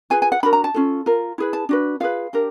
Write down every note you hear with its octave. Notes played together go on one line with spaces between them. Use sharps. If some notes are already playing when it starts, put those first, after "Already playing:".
F4 G#4 B4 G#5
G#5
F#5
D4 F#4 A#4 B5
A#5
A5
C#4 F4 A4
F4 A#4
E4 G#4 B4
A5
D4 F#4 B4
F4 G#4 B4 F5
D4 G4 A#4